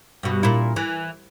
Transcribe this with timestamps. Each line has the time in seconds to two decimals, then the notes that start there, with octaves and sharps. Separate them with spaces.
0.23 G2 B2
0.43 A#2 E4
0.76 E3